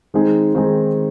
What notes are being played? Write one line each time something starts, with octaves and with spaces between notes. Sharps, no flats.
D#3 G#3 C4 D#4 G#4
D#3 G#3 C4 D#4 G#4